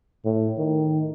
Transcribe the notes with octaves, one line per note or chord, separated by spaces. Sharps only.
A2
D#3